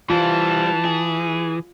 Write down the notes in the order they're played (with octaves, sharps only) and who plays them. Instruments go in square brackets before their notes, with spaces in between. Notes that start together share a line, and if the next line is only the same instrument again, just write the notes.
[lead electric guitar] E3 [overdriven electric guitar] G3 C5 [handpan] F4 [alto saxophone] A5
[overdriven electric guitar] G#4